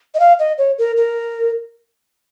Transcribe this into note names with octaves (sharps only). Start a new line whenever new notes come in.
D#5
F5
D#5
C#5
A#4
A#4